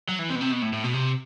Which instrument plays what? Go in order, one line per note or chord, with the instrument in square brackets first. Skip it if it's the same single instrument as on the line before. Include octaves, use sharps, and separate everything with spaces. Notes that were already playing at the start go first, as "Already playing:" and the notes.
[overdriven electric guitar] F#3
E3
C3
B2
C3
B2
A2
A2
B2
C3